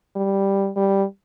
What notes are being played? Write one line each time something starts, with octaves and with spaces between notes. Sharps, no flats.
G3
G3